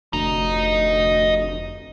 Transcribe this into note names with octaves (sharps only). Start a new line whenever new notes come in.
F1 D2 D#5 A#5